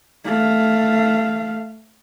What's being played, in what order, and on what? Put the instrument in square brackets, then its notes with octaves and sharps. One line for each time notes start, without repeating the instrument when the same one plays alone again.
[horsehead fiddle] A3 F5